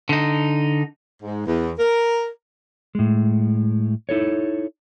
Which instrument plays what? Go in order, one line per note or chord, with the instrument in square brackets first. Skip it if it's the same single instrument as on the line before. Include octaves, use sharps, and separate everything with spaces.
[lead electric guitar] D3 D#4
[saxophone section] G#2
E2
A#4
[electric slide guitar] A2 G#3
D#4 E4 A4 C#5